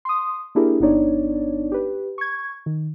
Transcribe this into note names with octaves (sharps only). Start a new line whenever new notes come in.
C6 D#6
A#3 D4 E4 G4 G#4 A#4
G1 B3 D4 D#4 C#5 D5
G4 B4
C#6 G#6
D#3